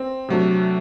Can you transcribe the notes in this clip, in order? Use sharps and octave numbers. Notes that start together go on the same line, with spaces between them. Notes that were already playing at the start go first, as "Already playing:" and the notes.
Already playing: C4
C3 F#3 A3 D4